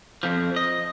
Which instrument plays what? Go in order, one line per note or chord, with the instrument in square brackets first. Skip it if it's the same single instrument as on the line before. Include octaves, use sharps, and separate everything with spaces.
[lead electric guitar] F2 F3
D#5